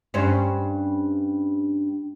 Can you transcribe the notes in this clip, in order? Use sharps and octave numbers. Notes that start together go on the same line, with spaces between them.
G2 C4 C#4